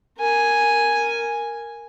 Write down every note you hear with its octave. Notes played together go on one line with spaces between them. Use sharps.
A#4 G#5